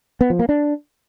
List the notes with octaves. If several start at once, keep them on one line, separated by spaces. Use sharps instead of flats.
B3
F3
A#3
D4